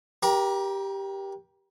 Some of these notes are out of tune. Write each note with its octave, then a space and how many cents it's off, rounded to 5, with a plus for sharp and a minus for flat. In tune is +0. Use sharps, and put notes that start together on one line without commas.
G4 +0 A#4 +40 A#5 +0